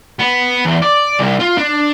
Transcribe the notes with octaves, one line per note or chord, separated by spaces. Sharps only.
B3
E2
D5
C2
F4
D4